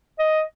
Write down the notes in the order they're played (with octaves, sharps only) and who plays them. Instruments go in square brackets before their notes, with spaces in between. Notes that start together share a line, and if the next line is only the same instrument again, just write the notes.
[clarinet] D#5